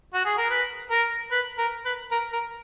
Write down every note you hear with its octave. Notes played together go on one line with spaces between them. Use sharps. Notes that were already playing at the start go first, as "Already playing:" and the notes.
F#4
G#4
A#4
B4
A#4
B4
A#4
B4
A#4
A#4